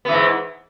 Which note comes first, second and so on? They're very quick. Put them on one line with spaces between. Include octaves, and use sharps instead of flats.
B3 E3 G#2